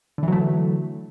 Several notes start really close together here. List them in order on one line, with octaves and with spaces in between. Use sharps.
D3 E3 F#3 A3